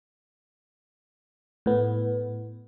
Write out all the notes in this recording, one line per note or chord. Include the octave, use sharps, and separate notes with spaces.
A2 B3